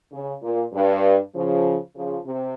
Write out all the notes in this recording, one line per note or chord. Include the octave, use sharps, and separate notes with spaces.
C#3
A#2
G2
C#3 F3
C#3 F3
C3